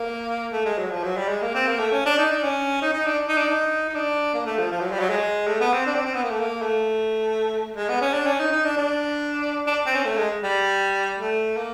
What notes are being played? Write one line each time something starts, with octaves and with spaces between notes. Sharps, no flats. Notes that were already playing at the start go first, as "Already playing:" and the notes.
Already playing: A#3
A3
G#3
F#3
F3
F#3
G3
G#3
A#3
C4
A#3
A3
C#4
D4
D#4
D4
C#4
D#4
D#4
D4
D#4
D4
D#4
D#4
D4
A#3
A3
F3
F3
F#3
G3
F#3
G#3
A3
B3
C4
D4
C4
C4
B3
A#3
A3
A#3
A3
G#3
B3
C#4
D4
C#4
D#4
D#4
D4
D4
D4
C4
C#4
A3
G#3
G3
A3
A#3